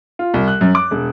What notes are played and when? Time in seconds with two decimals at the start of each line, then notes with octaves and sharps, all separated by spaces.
0.19 F4
0.34 C2
0.48 F#6
0.61 F#2
0.75 D6
0.91 E1